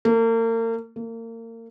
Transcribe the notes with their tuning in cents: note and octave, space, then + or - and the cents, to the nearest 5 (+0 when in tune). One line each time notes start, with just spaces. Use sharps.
A#3 -40
A#3 -35